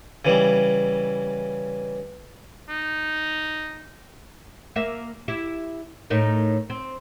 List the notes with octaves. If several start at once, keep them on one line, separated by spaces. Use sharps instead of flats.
C#3 E3 G3
D#4
A#3 E5
E4 G4
A2 D#4 A#4
C4